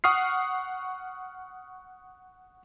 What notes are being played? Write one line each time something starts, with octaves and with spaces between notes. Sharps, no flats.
F#5 C#6 D#6 F6 C7